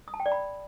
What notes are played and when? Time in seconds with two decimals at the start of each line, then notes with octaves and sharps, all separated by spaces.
0.08 D#6
0.14 A5
0.20 G5
0.26 D5
0.32 B5